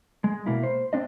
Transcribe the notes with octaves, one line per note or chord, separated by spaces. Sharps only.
G#3
B2 A#3 E4
C5
C4 D4 D#5